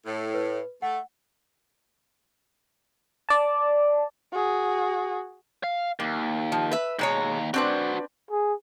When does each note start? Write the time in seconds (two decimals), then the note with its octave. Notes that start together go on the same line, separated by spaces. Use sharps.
0.06 A2
0.34 B4
0.82 A3 F#5
3.29 D5 A5
4.32 F#4 G#4
5.64 F5
6.00 D#2 A#3
6.52 F3
6.71 B4 E5
6.99 D#2 B2 G#3 C#5 A#5
7.54 C4 D4 F#4 B4 C5
8.31 G#4